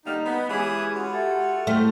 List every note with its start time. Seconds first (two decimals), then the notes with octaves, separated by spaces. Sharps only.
0.05 D3 G3 A#3 D#4
0.25 B3
0.49 E3 G#3 C#4 E4 G4 G#4 D6 D#6
0.96 F4 F#4
1.13 G4 A4 E5 F#5
1.67 A3 C4 E4 F5 F6